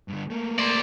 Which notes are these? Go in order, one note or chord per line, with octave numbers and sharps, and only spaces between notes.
G2 D3
A3 A#3
C5 D5